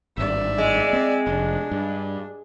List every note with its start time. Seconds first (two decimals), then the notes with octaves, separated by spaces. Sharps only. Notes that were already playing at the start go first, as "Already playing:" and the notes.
0.18 G#1 G2 D5 E5
0.58 G#3
0.93 B3 C4
1.27 F1 D4
1.72 G2